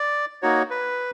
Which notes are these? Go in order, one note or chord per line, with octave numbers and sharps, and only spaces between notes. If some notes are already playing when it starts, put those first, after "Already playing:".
Already playing: D5
A#3 D#4 F#4 C#5
B4